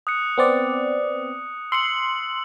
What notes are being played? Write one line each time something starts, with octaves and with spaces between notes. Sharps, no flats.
D#6 F#6 C#7
B3 C4 D5
C6 E6 C#7 F#7